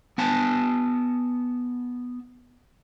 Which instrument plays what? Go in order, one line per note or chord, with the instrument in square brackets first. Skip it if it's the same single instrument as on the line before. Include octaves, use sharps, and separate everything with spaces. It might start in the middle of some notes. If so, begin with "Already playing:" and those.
[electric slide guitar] B3 G#5 A5